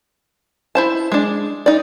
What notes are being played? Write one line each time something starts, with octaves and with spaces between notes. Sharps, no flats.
E4 C5 A5
G#3 D4
D#4 D5